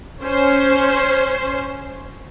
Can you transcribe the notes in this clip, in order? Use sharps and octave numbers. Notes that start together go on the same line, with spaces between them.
C#4 C5